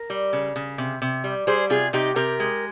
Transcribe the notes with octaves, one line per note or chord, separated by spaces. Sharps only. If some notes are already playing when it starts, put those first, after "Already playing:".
Already playing: A#4
G3
C#3
C#3
C3
C3
G3
G3 G#4 C5
C3 F4 G#4
C3 D#4 G4
C3 G4 A#4
G#3